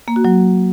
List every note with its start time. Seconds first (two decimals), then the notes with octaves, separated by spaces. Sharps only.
0.08 A#3
0.16 F#4
0.25 F#3